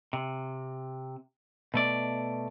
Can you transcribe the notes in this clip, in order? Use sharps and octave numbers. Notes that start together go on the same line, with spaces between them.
C3
B2 A3 D5